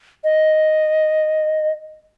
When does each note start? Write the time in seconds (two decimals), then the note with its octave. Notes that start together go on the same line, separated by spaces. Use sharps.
0.24 D#5